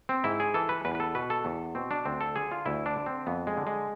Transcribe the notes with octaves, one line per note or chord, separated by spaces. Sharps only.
C4
G#2 E4
G#4
E3 A4
B4
E2 B4
B4
A4
B2 B4
A4
E2
B2 C4
D4
D2 C4
A4
D3 G#4
F4
D2 E4
D4
D3
C4
F2 B3
G#3
D3
G#3